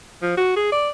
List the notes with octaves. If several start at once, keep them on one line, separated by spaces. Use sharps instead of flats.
F3
F#4
G#4
D5